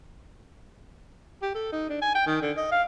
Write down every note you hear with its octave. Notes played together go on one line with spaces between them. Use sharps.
G4
A4
D#4
D4
G#5
G5
D#3
D3
D#5
F5